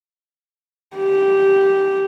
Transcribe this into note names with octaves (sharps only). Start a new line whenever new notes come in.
G4